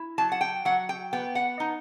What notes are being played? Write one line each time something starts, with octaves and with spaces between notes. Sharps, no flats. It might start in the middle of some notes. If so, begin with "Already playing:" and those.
Already playing: E4
F#3 A5
F#5
G5
F#3 F#5
G5
B3 G5
F#5
D#4